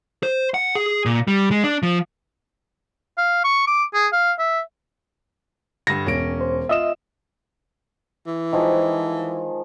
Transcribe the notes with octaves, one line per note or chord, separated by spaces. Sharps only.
C5
F#5
G#4
A#2
G3
G#3
D4
F3
F5
C#6
D6
G#4
F5
E5
G2 D3 A#6
E1 C#4 D7
C5
F4 D#5 E5 E7
E3
D#3 F3 G#3